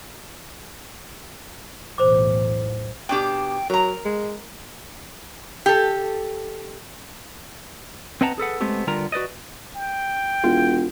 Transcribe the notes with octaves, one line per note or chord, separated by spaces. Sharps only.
B1 E2 A2 C5 D6
B2 D4 G4 G5
F#3 A#4 A#5
G#3
G4 A4
C4 B4 D#5 F#5 A5 A#5
G#4 A4 B4 F#5
G#3 A3 B3 C4 G4
D3 G3 B3 F4 A#4 A#5
F#4 B4 D5 D#5
G5
E1 F4